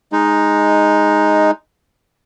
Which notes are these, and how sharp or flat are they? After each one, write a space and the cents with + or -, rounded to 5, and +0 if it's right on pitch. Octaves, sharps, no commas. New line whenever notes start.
G#3 +0 D#4 +0